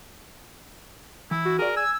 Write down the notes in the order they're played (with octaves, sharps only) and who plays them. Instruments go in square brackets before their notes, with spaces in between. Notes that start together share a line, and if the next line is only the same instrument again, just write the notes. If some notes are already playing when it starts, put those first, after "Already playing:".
[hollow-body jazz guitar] E3 [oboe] E4
[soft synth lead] F#4
[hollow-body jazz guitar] G#4 D5 [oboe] A#4
[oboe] G#5 [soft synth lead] E6